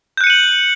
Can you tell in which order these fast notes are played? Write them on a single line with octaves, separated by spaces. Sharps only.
G6 F#6 C#7 D#7 F#7